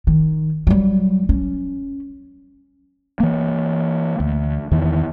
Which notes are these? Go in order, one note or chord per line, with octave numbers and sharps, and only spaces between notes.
D#3
F#3 G3
C#4
E3 A#3
D2
E2 D#3 E3